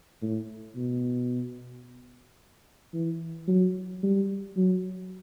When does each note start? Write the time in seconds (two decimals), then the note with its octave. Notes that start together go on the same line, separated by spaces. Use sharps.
0.22 A2
0.76 B2
2.94 E3
3.48 F#3
4.03 G3
4.57 F#3